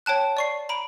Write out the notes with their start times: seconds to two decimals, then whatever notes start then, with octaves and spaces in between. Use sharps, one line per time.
0.06 C#5 G5 A5 F#6
0.37 D5 C#6 C7
0.69 A#5 B5 D7